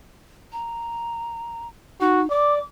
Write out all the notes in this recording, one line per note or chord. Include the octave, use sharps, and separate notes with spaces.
A#5
D#4 F#4
D5 D6